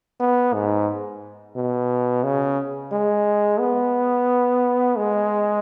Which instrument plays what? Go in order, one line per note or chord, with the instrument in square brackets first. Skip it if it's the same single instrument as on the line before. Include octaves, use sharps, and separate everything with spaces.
[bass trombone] B3
G#2
B2
C#3
G#3
B3
G#3